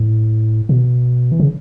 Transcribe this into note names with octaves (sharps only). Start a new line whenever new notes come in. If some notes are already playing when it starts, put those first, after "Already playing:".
Already playing: A2
B2
E3
C#3